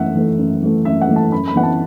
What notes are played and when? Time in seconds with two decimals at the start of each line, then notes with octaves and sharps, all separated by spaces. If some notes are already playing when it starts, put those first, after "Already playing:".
Already playing: F#2 E3 A3 E5 F#5
0.16 E3 A3
0.39 F#2
0.63 E3 A3
0.85 F#2 E5
1.01 F#5
1.09 E3 A3
1.16 A5
1.32 F#2 B5
1.48 B5
1.56 E3 B3 E4 F#5
1.63 A5